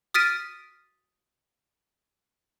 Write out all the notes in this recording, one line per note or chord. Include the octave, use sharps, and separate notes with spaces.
D#6 F6 A6 B6 D7 D#7